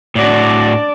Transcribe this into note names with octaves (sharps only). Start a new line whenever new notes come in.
A2 D4 F#4 D5